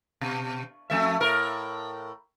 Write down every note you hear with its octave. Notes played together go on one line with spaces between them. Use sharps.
B2
F2 A3 E5
A2 A#4